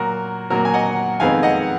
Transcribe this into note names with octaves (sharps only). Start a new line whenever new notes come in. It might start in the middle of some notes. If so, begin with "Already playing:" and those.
Already playing: A#2 F#3 A#3 F#4 A#4
A#2 F#3 A#3 F#4 A#4
G#5
D#5 F#5
F2 D#3 G#3 B3 F5 G#5
D#5 F#5